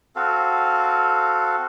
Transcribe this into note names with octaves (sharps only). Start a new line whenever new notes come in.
C4 F#4 A4 F5